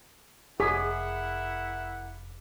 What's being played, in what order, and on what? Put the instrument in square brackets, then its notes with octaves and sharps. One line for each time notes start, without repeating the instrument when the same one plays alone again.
[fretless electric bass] F1 [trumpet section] E4 A#4 F#5 [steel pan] G#4 [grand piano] D6 B6